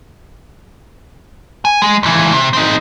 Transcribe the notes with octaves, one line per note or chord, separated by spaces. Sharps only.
G#5
G#3
C#2 E3
C3
C4 D#4